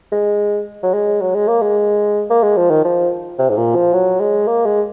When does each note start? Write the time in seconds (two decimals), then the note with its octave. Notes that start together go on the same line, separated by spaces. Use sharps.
0.12 G#3
0.83 F#3
0.94 G#3
1.21 F#3
1.35 G#3
1.48 A#3
1.62 G#3
2.30 A#3
2.43 G#3
2.57 F3
2.71 D#3
2.85 F3
3.39 C3
3.49 G#2
3.57 A#2
3.75 F3
3.93 F#3
4.20 G#3
4.47 A#3
4.66 G#3